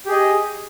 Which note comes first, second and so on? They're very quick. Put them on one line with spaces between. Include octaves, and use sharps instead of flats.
G4 G#4 D#5